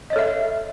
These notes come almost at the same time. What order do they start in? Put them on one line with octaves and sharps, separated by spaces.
D#5 C#5 A4 E5